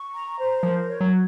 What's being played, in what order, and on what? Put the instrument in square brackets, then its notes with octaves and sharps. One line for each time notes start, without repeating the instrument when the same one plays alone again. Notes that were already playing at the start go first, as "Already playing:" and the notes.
Already playing: [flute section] C#6
A#5
C5
[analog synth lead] F3 [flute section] A#4
[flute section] C#5
[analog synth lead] F#3